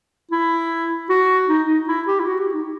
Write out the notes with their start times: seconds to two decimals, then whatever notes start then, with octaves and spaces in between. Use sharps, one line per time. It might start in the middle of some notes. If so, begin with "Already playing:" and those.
0.31 E4
1.10 F#4
1.49 D#4
1.69 D#4
1.88 E4
2.08 G4
2.20 E4
2.27 F#4
2.40 G4
2.53 D#4